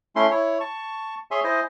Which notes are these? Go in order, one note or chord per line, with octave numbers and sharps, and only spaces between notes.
A3 C#4 E4 C6
E4 C#5
A5 C#6
G#4 C#5 E5 G#5 C6
E4 C5 D#5 G#5